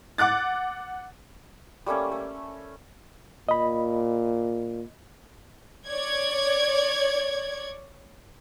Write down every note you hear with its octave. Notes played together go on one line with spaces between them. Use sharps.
F#5 D6 F#6 A6
G3 A3 A#3 C#4
A3
A#2 D#5 B5
C#5 D5 G#6